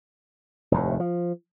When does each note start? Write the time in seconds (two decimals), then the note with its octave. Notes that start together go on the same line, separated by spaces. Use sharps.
0.72 F1 D#2 A2
1.00 F3